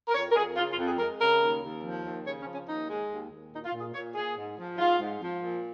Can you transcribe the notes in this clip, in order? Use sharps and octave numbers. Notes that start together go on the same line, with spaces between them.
A#4
F2 C#5
A#4
F2 G#4
C#3 F4
F4
F2
G#4
G#3 A#4
C#3 A#4
D#2
D#2
F3
D#2
C#3 C#5
C#4
F3
C#4
D#2 D#4
G#3
D#2
D#2
A#2 D#4
F4
A#2
G#4
A#2 C#5
A#2 G#4
G#2
F3
G#2 F4
G#2
F3
A#2